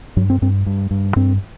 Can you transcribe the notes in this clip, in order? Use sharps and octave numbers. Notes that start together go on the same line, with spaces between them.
G2 F#3
C4
G2 C4
G2
G2
G2 C4